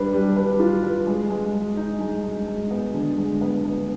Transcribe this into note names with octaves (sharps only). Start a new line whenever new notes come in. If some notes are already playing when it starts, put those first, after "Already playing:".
Already playing: G3 D4 B4
G3
B4
F4
B4
G#3
G#3
G#3
D#4
G#3
G#3
G#3
B3
D3
G#3
B3
B3